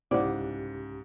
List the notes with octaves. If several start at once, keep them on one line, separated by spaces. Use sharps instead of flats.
C2 G#2 C#3 E4 G4 C5 D5 F#5